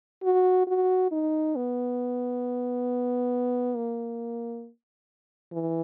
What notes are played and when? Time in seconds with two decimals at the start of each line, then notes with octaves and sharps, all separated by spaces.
0.23 F#4
0.67 F#4
1.11 D#4
1.56 B3
3.76 A#3
5.53 E3